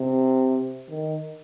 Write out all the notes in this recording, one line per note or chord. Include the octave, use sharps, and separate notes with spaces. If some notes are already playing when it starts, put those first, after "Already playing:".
Already playing: C3
D#3